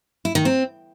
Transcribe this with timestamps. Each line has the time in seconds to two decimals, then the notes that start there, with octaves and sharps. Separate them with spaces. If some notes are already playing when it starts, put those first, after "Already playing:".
0.25 E4
0.35 D#3
0.45 C4